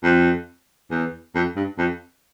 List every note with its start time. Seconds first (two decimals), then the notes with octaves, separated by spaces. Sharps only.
0.04 F2
0.91 E2
1.35 F2
1.56 G2
1.78 F2